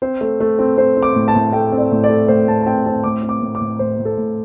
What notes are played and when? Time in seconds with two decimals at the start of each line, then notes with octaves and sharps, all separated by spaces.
0.02 C4 C5
0.21 A3
0.40 A3
0.59 C4
0.77 C4 C5
0.97 C4
1.03 D6
1.15 A2
1.28 A5
1.35 A2
1.53 A3 G5
1.72 C4
1.78 D5
1.91 A2
2.04 D5
2.10 A3
2.28 A2 C5
2.48 A2 A5
2.63 A5
2.66 C4 G5
2.86 C4 A5
3.04 A2 D6
3.23 C4
3.29 D6
3.42 A2
3.55 D6
3.61 A2
3.79 A2 C5
3.99 A2
4.05 A4
4.17 A2